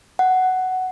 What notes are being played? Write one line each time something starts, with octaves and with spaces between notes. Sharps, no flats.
F#5